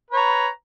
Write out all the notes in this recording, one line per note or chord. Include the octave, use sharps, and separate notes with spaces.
B4 C#5 A#5